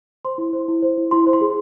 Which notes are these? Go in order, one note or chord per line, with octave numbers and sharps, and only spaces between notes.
C5 C6
E4
C5
E4
C5
E4
E4 C6
C5
C6
G#4